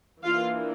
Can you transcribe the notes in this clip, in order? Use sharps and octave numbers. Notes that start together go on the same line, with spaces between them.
E3 A#3 D4 F4 F5